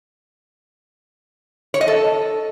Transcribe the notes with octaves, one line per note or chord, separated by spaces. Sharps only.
C#5
D#5
A4